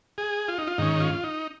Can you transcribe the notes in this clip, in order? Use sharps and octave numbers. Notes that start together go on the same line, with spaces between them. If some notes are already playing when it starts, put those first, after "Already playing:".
G#4
F4
D#4
F4
G#2 D#3 C#4 D#4
F4
D#4